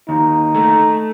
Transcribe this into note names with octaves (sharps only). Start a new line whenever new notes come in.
D#2 D#4
A3